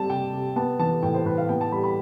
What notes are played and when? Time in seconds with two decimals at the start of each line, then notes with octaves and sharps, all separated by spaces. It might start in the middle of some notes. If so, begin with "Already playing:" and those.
Already playing: G3 C4 A5
0.09 C3 G5
0.33 C3
0.56 B3 A5
0.79 E3 A5
1.03 A2 G5
1.14 C5
1.26 A2 B4
1.38 F5
1.49 B3 G5
1.61 A5
1.72 G3 B5
1.84 B5